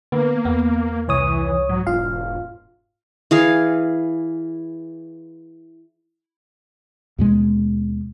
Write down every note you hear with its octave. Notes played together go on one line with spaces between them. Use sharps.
D3 A#3 B3
E2 B3
C2 E3 C#5 D#6
G#2 F#3
E1 F4 F5
E3 G#4 F5
D#2 B2 G#3